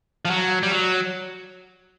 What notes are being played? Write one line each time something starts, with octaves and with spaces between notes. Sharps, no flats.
F3
F#3
G3
F#3